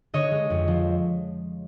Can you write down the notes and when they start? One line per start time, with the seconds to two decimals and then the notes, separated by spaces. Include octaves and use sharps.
0.14 D3 C#5 D#5
0.31 G#3
0.50 F2
0.68 F3